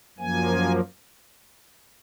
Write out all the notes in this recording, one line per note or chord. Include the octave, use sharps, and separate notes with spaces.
F#2 F3 A#3 G#5